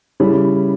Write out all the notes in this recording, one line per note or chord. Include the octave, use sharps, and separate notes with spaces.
C#3 G3 C#4 E4